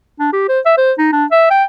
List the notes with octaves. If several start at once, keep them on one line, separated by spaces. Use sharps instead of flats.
D4
G4
C5
E5
C5
D#4
D4
E5
G5